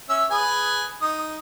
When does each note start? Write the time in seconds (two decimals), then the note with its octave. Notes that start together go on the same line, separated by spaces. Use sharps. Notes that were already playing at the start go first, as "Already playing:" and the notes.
0.09 C#4 E5 E6
0.31 G#4 B4 G#5
1.02 D#4 D#6